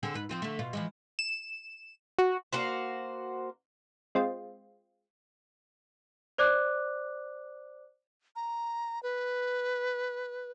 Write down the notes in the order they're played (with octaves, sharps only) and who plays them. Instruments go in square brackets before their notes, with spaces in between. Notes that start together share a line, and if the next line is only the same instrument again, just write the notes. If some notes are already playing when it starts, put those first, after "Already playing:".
[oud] D3 C4 G#4
G#2 B4
F3 C4 F4
D3 A3
B2 F4
E3 F3 G#3
[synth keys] E7
F#4
[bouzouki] A#3 F#4 C5
[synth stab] G#3 C4 F4
[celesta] C5 D5 D6 F#6
[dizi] A#5
B4